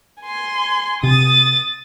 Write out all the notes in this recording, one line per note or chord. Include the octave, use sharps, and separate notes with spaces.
G#5 C6
C3 D#6 A6